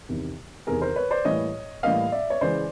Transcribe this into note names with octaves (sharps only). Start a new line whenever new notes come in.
E2 C3 D#3
E2 C3 D#3 G#4 A#4
A#4 C5
B4 C#5
C5 D5
A2 E3 G3 A#3 C#5 D#5
A2 E3 G3 A#3 D#5 F5
D5 E5
C#5
C#3 E3 G#3 C5 D5